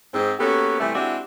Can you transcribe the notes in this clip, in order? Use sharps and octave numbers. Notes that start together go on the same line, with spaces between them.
G#2 C4
A#3 B3 C#4 F#4 G4 A4
C3 E3 G3 A3
G#3 C4 D4 E4 F#4 G4